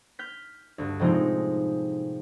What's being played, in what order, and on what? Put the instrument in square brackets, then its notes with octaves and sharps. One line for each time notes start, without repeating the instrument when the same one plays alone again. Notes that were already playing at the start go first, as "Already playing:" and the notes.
[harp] F6 G6 B6
D2 G2
A2 C3 F3 G#3 C4 D#4